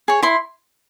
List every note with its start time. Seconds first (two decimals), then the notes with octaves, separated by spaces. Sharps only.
0.08 G#4 C#5
0.23 E4 C6